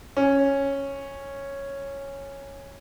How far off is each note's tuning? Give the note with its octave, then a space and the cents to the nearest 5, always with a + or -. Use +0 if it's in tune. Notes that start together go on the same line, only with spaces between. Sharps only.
C#4 -5